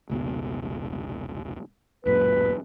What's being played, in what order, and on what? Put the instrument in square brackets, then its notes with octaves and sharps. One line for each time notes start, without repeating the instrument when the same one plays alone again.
[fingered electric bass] F1 C#2 B2
[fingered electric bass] D1 F#2 A#2 [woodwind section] B4